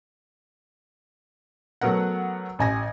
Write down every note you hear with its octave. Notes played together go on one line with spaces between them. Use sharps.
F#3 A3 B3 A#4 F#5
A1 G#5 A#6